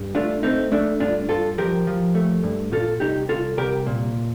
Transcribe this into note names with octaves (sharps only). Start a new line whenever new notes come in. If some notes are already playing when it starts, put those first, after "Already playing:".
Already playing: G2
A3 D4 F4
A3 C4 D#4
A3 D4
G2 D4 F4
G2 F4 A4
F3 G4 A#4
F3
A3
G2
A#2 F4 A4
C2 D#4 G4
C2 F4 A4
C2 G4 A#4
A#2